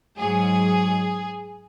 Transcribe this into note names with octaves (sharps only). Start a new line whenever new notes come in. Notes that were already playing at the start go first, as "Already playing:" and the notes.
G#2 F#3 G#4